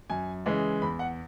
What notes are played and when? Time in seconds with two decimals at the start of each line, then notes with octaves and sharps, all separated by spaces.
0.10 F#2 G#5
0.46 C#3 E3 G#3
0.82 E2 B5
0.99 F#5